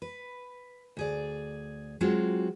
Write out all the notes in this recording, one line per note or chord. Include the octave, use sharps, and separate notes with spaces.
B4
D2 G#4 D5
F#3 G#3 C4 F4 F#4